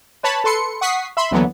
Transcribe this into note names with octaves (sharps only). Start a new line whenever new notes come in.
B4 C#5 A5 B5
A4 B4 C6 C#7
F#5 C#6 D#6 B6 C7
E5 B5 C6
D#2 D3 E3 F#3 B3